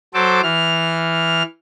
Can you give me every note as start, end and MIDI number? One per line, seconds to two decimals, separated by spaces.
0.14 0.41 54
0.14 0.41 69
0.14 0.41 72
0.14 0.41 86
0.43 1.43 52
0.43 1.43 89